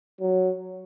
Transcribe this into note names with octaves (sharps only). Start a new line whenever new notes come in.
F#3